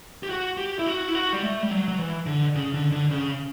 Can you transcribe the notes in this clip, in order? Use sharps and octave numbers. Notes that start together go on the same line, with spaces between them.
G4
F#4
G4
E4
F#4
E4
F#4
G3
A3
G3
F#3
F#3
E3
D3
C#3
D3
D3
C#3